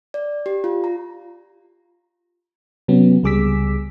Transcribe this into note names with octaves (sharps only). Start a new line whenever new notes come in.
D5
G4
F4
A#5
C3 F#3 B3 C#4
C#2 G3 G#4 D6 E6 B6